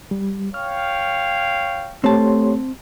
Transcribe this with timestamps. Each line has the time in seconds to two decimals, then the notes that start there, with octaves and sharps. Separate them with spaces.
0.11 G3
0.54 C#5 F5 G5 F6
2.04 A3 C4 G4 C#5 A5 C6